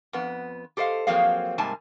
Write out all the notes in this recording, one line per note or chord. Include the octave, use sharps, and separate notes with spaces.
F2 B3
G4 A4 C5 D#5 F5
F3 F#3 A#3 C4 G#4 F5
G#2 C3 G3 A#3 G#5 A5